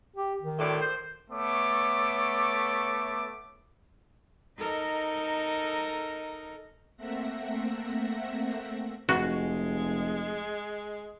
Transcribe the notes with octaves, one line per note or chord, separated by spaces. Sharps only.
G4
D#3
D2 A2 D5
C5
A3 B3 C#5 D6
D#4 A4 A#4 D#5 A#5
A3 A#3 C4 E5 F#5 A#6
F1 G#3 F#4